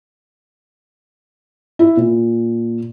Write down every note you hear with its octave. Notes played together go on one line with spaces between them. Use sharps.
E4
A#2